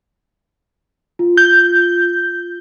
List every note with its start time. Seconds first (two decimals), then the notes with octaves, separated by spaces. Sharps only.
1.19 F4
1.37 G6